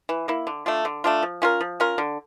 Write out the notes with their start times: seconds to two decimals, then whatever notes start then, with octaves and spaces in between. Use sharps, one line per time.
0.09 E3
0.28 A#3 E4
0.47 D3
0.66 A3 D4 F4
0.85 D3
1.04 A3 D4 F4
1.23 F3
1.42 C#4 F4 A#4
1.61 F3
1.80 C#4 F4 A#4
1.98 D3